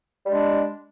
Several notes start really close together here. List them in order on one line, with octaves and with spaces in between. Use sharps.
G3 D4 G#3